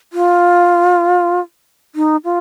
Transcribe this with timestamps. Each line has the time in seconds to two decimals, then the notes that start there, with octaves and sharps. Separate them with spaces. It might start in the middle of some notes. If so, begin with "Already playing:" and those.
0.13 F4
1.95 D#4
2.24 F4